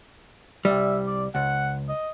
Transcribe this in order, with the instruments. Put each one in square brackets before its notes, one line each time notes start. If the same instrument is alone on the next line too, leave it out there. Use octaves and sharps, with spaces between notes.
[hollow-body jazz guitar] C2 G3 [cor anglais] E5
[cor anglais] D5
[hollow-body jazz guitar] C#2 [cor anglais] F#5
[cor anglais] D#5